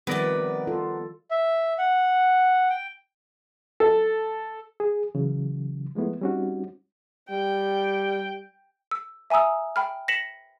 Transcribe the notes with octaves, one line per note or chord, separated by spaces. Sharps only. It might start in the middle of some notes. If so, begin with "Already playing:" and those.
C3 D#3 F3 G3 B3 A#4 B4 D5
F4 A4
E5
F#5
G5
A4
G#4
C#3 E3 F#3
F3 G#3 A3 B3 E4
G3 C4 C#4 D#4 F#4
G3 G5
E6
E5 G#5 A#5 D#6 E6
G5 B5 F6
A#6 B6 C#7 E7 F#7